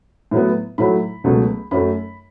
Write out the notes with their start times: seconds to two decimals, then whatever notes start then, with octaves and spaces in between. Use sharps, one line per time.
0.31 A2 F#3 B3
0.78 A2 F#3 A3 B5
1.24 C#2 B2 F#3 A3
1.71 F#2 F#3 A3 B5